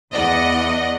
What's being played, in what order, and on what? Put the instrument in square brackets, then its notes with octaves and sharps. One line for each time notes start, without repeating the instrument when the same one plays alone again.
[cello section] E2 [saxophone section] D5 [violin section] D#5 F#5